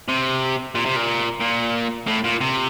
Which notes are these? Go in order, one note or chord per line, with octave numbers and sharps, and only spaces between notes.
C3
A#2
C3
A#2
A#2
A2
A#2
C3